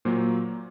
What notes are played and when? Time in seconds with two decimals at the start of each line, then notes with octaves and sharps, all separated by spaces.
0.05 A#2 F#3 A#3 C5